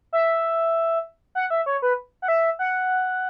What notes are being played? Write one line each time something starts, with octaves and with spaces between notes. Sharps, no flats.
E5
F#5
E5
C#5
B4
F#5
E5
F#5